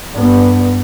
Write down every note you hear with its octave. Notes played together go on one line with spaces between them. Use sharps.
G2 B3